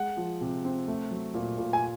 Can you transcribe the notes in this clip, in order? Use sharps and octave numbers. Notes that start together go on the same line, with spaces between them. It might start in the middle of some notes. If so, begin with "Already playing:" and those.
Already playing: G#3 F#5
F3
C3
C4
A3
F#3
A#2
A#2
G#5